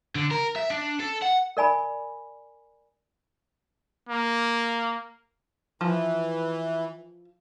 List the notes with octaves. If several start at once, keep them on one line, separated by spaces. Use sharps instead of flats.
D3
A#4
E5
D4
A4
F#5
A#4 D5 G#5 B5
A#3
E3 F3